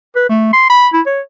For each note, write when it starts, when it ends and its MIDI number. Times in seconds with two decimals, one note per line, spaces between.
0.16 0.27 71
0.29 0.52 57
0.53 0.65 84
0.70 0.88 83
0.93 1.01 64
1.06 1.21 73